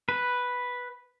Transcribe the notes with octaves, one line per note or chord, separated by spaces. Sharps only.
B4